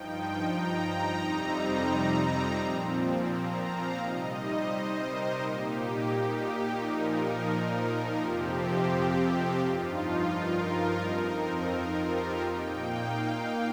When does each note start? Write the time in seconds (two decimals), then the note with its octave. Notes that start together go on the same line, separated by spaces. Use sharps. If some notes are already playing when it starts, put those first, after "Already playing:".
Already playing: G2 F3 D#4 G5
0.48 A#5
1.18 F2 C3 G3 C4 D#4
2.58 A#2 F3 C4
3.28 A#5
3.64 F5
3.99 C3 G3 D#4 D#5
4.34 C5
4.68 C5
5.04 A#4
5.39 A#2 A#3 D#4 G4
6.10 G4
6.45 G4
6.80 A#2 F3 D#4 A#4
8.20 F2 C3 F3 C4 G4
9.60 G2 F3 D#4 F4
10.31 A#4
11.02 F2 F3 C4 D#4
11.71 F4
12.07 G4
12.42 A#2 A#3 D#4 G5
12.78 F5